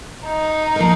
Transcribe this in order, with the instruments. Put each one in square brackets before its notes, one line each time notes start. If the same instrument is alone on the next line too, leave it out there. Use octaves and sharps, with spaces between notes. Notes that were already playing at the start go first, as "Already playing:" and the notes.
[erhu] D#4
[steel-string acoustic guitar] F3 A#3 F4 A#4